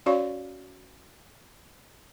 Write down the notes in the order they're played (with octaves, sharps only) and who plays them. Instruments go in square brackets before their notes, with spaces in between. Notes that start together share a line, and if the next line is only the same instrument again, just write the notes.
[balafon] C#4 F#4 C#5 D5 F5 C#6